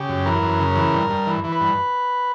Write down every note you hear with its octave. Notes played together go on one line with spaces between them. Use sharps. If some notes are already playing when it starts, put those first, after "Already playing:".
Already playing: C#3 G4
F#2
E3 A#4
F#2
C#3
E3
G2
G2
E3
E3
B4
G2